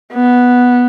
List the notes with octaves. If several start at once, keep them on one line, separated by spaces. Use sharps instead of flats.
B3